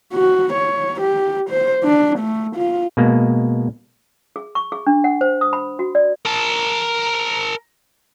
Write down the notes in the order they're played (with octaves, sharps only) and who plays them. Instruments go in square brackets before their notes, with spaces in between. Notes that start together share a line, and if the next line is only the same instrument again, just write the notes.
[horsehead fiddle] F#4
C#5
G4
C5
D4
A3
F4
[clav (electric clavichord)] B2 G#3 A#3
[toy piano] G#4
C#6
G#4
D4
F#5
C5
D#6
B5
F#4
D5
[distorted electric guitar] A#4 A5